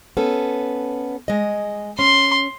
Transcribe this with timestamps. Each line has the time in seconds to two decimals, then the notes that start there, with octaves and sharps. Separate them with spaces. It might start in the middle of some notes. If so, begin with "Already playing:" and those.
0.17 B3 C#4 A4
1.28 G#3 D#5
1.99 C#4 C6